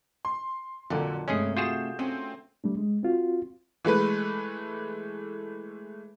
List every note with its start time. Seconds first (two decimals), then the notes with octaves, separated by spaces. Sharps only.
0.25 C6
0.90 F2 A#2 D3 F#3
1.28 G2 C3 G#3 A3 C#4 G#4
1.57 F4 F#4 G#4 G6 E7
1.99 A3 C4 C#4 G#5
2.64 G3 A3 D4
2.77 G#3
3.03 C4 F4 F#4
3.85 E3 G#3 A3 B4